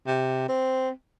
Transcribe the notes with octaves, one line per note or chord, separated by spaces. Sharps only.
C3
C4